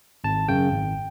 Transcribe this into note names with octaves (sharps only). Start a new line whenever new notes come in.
G#1 A5
F#2 C#3 G5
G#1